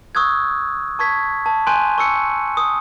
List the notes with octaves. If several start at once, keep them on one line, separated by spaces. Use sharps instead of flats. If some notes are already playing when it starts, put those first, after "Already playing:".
C#6 D#6 E6 F#6 G#6
A5 C#6 G#6 B6
A5
G#5 C6 F#6 G6 D#7
C#6 E6 C#7
D#6